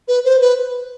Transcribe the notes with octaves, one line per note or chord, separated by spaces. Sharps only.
B4
C5
B4